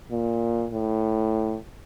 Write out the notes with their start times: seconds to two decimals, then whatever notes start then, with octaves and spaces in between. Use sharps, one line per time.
0.11 A#2
0.73 A2